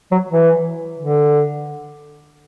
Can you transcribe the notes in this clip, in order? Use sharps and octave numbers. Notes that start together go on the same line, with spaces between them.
F#3
E3
D3